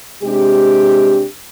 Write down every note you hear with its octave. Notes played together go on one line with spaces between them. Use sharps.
C3 G#3 D4 G4